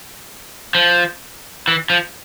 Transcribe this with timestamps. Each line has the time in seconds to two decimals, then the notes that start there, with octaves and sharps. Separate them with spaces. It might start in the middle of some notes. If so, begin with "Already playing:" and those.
0.75 F3
1.68 E3
1.90 F3